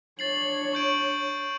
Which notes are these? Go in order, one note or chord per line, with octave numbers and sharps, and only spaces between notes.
D4 C#5 A6 C7 F#7
C#6 G6 D7